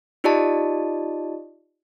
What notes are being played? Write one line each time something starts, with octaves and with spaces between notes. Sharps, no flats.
D#4 F4 G4 D5 D#5 A5